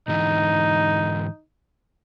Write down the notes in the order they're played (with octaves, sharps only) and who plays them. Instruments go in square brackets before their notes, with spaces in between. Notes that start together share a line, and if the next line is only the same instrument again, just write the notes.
[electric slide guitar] G#2 D3 E3 [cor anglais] D#4